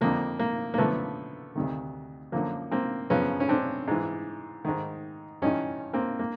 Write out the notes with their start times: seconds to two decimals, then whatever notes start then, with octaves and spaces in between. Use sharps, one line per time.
0.01 F2 D3 F3 A#3
0.39 A#3
0.74 A#3
0.78 F#2 D3 F3 A3 B3
1.55 D2 C3 D#3
2.32 F#2 D3 F3 A#3
2.71 A#3 C4
3.10 F#2 C#3 F3 B3 C#4
3.40 C#4
3.49 C4 D4
3.88 G#2 E3
4.65 G#2 D#3
5.42 G2 E3 C#4 D#4
5.93 A#3 C4
6.19 A#3